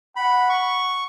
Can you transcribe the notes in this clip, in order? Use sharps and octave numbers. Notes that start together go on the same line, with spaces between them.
F#5 B5
C#6